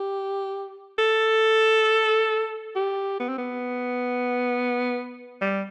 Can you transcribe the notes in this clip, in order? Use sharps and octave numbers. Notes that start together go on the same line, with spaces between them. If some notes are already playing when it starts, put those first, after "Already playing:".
Already playing: G4
A4
G4
B3
C4
B3
G3